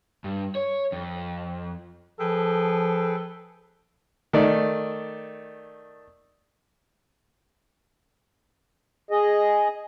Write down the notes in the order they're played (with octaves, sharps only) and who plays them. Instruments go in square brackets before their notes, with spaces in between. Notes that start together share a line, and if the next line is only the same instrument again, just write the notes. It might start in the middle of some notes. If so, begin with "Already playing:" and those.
[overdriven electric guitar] G2
C#5
F2
[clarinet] F3 [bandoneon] G#4 B4 G5 [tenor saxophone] A4
[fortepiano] D#3 A3 D5
[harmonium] G#4 D#5